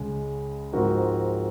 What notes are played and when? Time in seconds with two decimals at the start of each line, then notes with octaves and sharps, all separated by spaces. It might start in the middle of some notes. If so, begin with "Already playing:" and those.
Already playing: C#2 C#3 G#3
0.73 G#2 F3 C4 F#4 A#4